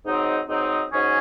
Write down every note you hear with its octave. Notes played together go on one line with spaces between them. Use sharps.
G#2 F#3 C4 D#4
G#2 F#3 C4 D#4
G#2 F#3 C#4 G#4